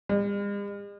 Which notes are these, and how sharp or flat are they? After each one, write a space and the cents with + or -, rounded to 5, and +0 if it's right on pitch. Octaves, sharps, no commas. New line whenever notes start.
G3 +45